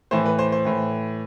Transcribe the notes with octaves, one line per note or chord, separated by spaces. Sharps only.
A2 E3 C5
B4
C5
C5
A2 E3